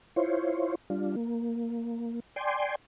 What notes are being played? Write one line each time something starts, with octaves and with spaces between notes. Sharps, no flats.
E4 F4 C5 C#5
G3 D4 F4
A#3
D5 G5 G#5 C6